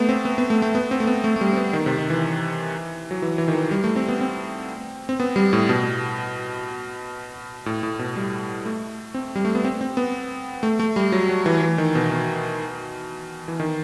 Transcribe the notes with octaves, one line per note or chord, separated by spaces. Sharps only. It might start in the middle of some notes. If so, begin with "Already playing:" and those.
Already playing: A3 B3
C4
B3
B3
A3
A3
B3
C4
A3
B3
A3
A3
G3
C4
B3
D#3
C3
D#3
E3
F#3
E3
E3
D#3
E3
G3
A3
C4
B3
C4
C4
B3
G3
A2
B2
A2
A2
B2
G3
A3
C4
G3
A3
B3
C4
C4
B3
A3
A3
G3
F#3
F#3
E3
E3
D#3
B2
B2
E3
D#3